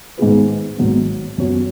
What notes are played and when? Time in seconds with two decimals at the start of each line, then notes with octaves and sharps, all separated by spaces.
0.18 G#2 D#3 B3 G#4 B4
0.77 G#1 G#2 F#3 B3
1.37 F#2 F#3 B3 F#4 C#5